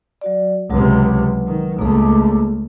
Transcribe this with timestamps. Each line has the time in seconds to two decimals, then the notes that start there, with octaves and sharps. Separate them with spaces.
0.21 F#3 F#4 D5
0.71 C#2 C3 F#3 B4
1.47 D#3
1.79 C#2 A3 A#3 G#4